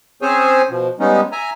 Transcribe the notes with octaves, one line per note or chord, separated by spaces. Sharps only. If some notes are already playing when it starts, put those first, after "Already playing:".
C4 C#4 G#4 C5 C#5 G#5
B2 F3
G3 G#3 B3 C#4 D#4
E5 G#5 A#5